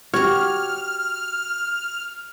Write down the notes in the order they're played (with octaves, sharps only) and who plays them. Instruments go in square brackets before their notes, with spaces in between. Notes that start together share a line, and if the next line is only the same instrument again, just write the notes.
[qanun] F#4 G4 [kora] C#5 [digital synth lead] F6